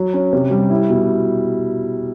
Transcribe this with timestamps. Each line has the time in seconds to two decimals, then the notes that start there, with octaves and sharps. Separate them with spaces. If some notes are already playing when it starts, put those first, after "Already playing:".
Already playing: F#3
0.14 C#4
0.33 C3
0.51 G3
0.70 E4
0.90 B2